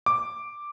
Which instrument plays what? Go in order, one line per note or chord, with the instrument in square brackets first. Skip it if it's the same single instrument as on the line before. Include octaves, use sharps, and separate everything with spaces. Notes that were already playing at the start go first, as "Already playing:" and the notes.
[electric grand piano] D6